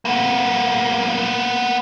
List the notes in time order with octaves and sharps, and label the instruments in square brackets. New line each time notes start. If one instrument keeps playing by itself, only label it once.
[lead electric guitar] A#3 B3